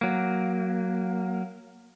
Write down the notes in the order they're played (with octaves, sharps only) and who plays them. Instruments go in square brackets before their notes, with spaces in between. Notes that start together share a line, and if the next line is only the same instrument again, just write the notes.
[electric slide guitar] F#3 A#3